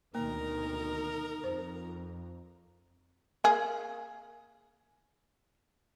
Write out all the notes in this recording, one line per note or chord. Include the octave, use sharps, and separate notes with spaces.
D2 B2 D#3 A#3 D#4 A#4 A#5
F2 C5
A#3 G#4